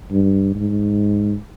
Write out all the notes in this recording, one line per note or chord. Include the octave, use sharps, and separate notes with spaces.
G2
G#2